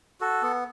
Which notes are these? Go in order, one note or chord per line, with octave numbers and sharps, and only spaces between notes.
F#4 A4
B3